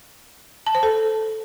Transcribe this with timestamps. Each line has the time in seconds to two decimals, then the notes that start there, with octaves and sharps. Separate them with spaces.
0.67 A5
0.75 C5
0.83 A4